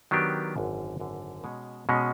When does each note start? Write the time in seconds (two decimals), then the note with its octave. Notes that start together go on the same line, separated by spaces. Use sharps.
0.11 D#3 F#3 B3 D4 G4
0.56 G#1 F#2 D3
1.00 G#1 F#2 D3
1.44 B2 G#3 C#4
1.89 B2 G#3 C#4